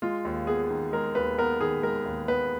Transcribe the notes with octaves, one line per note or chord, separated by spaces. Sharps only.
G#3 F4
D#2
B3 G#4
D#3
G#3 A#4
D#2 B4
B3 A#4
D#3 G#4
G#3 A#4
D#2
B3 B4